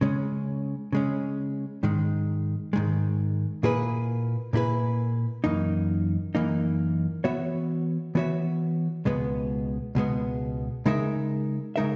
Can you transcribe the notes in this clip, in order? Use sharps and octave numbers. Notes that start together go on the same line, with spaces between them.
C#3 G#3 C#4
C#3 G#3 C#4
G#2 D#3 G#3
G#2 D#3 G#3
A#2 A#3 E4 G#4 B4
A#2 A#3 E4 G#4 B4
F#2 E3 A#3 D#4
F#2 E3 A#3 D#4
E3 B3 F#4 C#5 E5
E3 B3 F#4 C#5 E5
C#2 B2 G#3 B3
C#2 B2 G#3 B3
C#3 G#3 D#4 A#4 E5
C#3 G#3 D#4 A#4 E5